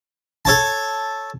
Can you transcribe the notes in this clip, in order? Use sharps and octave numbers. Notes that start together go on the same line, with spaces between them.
A4 C#5 A5